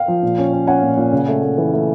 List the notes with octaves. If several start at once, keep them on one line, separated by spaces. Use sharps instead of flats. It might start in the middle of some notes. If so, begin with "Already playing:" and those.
Already playing: F5 G5
F3
A#2
C#4
C#4
C#4 F#5 G#5
A#2
A#2
C#3
A3
A3
E3
A3